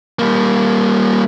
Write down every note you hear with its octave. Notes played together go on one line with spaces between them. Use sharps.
G3 A#3